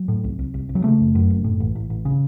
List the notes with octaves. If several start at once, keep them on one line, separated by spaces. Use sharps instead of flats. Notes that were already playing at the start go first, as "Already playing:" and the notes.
Already playing: F#3
A2
C2
C2
C2
C2
F#3
C#3 A3
F#1
F#2
F#1
A2
A1
A1
A1
C#3